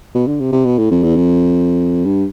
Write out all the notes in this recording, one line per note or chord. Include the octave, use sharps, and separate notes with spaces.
B2
D3
C3
C3
B2
A2
F2
E2
F2
G2